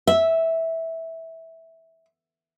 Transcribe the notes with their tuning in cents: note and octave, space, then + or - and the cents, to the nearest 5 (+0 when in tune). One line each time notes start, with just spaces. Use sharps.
E5 -10